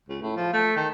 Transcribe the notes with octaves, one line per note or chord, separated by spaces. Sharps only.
C#2
A2
F3
A3
D#3